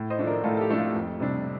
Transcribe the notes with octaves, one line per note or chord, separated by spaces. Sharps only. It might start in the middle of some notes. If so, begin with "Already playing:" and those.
Already playing: A2
C5 D#5
F3 A3 D4
A#4 D5
A2 F4 A4
A4
G4
F3 A3 D4
F4
F2
C3 G3 D4